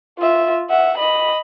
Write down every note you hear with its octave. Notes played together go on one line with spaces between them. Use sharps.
F4 E5
E5 F#5
D#5 B5